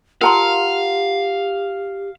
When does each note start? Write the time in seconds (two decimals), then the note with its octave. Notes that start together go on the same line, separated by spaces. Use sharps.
0.21 F4 G4 A#4 F5 F#5 A5 A#5 C6